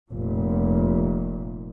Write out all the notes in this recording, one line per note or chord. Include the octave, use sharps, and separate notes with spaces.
F1 A#2